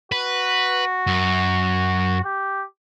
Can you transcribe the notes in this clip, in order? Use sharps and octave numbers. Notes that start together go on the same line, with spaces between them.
F#4 B4
F#2
G4